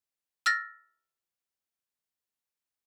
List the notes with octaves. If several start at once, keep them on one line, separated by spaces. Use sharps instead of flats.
E6 F6 A6 A#6